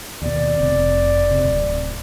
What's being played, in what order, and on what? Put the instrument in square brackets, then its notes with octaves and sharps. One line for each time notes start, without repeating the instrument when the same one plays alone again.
[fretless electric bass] D#2 B2 [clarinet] D5
[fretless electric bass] F1 C3
C3
D1